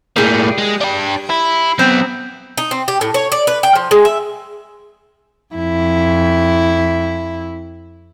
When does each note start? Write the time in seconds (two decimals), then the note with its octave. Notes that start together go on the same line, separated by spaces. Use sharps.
0.16 A2 G3 A#3 G#4
0.58 G#3
0.81 D4 G5
1.30 E4
1.79 F#3 B3 C4
2.58 D#4
2.71 C4
2.88 G4
3.01 A2
3.14 C#5
3.32 D5
3.47 B4
3.63 G5
3.75 F3
3.91 G#3
4.05 E5
5.54 F2 E4